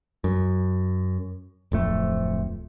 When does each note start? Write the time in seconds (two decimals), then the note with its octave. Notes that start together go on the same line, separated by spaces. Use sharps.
0.24 F#2
1.72 D1 F2 A3